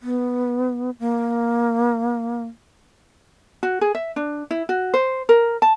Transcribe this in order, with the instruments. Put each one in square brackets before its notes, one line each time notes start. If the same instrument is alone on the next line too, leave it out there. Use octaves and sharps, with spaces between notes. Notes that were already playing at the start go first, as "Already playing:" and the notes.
[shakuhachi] B3
A#3
[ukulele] F#4
G#4
E5
D4
E4
F#4
C5
A#4
A5